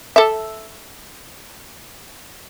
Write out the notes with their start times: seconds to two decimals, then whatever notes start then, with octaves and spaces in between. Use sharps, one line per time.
0.16 A4 E5